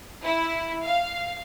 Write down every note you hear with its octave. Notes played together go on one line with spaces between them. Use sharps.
E4
F5